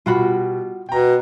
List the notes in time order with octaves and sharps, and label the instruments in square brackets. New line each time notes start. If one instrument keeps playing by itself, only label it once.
[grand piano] B2 G3 [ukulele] F4 F#4 B5
[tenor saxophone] B2 [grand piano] G5 A#5